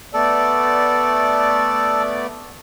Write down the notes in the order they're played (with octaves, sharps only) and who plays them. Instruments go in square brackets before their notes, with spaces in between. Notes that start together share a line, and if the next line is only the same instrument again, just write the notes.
[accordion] A3 B3 D5 [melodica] A4